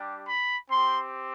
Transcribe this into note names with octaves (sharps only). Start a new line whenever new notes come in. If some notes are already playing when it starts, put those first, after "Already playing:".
Already playing: G3 D4 G4
B5
C4 G4 C6